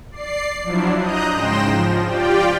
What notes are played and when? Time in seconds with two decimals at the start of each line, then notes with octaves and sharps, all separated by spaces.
0.11 D5 C7
0.64 F3 F#3 D4 E4
1.00 D#5 A#5 D#6 F#6 G6
1.32 G#2 C#3 G5 C6 A#6 E7
1.65 F3
2.07 F4 G4 D5 G5